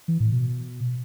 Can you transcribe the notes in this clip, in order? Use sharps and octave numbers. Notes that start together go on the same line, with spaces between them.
E3
A2
B2